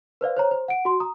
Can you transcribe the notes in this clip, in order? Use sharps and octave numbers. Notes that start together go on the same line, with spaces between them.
B4 C5 D5 F5
C5 C#5 A#5
C5
F#5 D7
F#4 C6
A#5 D#6